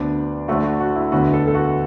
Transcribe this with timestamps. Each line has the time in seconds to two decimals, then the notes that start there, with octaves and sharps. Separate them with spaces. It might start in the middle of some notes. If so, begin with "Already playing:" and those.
Already playing: D2 D3 B3 D4 D5
0.48 D2 D3 A3 D4 F#4
0.64 F#4
0.80 F#4
0.96 E4
1.12 E1 D2 D3 B3 F#4
1.34 A4
1.48 A4
1.55 F#4